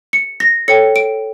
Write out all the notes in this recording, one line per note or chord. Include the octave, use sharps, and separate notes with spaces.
C#7
A#6
A4 C#5 G5 C#7
D7